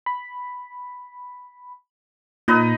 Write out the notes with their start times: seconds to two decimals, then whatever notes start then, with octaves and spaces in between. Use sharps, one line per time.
0.06 B5
2.48 A#2 D#4 B4 D#5